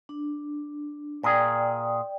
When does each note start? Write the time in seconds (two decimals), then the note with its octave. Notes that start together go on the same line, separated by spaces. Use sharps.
0.09 D4
1.24 A#2 G#4 D5 G5